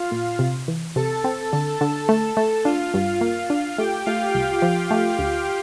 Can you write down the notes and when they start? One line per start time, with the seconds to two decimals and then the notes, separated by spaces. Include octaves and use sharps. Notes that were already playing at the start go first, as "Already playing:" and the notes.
Already playing: F4 F5
0.11 A#2
0.39 C3
0.68 E3
0.96 C3 A4 A5
1.24 C4
1.52 D3 A4 A5
1.81 D3
2.09 A3 A4 A5
2.37 A3 A4 A5
2.65 D4 F4 F5
2.94 G2
3.21 A#3
3.50 D4
3.78 A3 G4 G5
4.06 A3 F4 F5
4.34 C2 G4 G5
4.62 F3
4.91 A3
5.19 D2